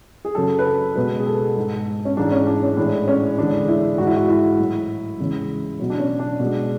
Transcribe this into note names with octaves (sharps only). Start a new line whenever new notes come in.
G#4
F#2 C#3 F#3 A4
B4
A4
B2 G#3 B4
G#4
A4
G#2 G#3
C#4
G#2 E3 G#3 D4
C#4
D4
C#4
A2 E3 G#3 D4
C#4
E2 D3 G#3 D4
E4
G#2 E3 G#3 F#4
E4
F#4
E4
A2 F#3
E2 C#3 G#3
B2 F#3
D4
C#4
D4
B2 G#3